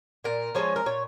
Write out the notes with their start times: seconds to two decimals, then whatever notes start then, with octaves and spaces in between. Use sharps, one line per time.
0.24 A#2 A#4
0.55 F3 G#3 C#4 C#5
0.76 A#4
0.86 A#2 C#5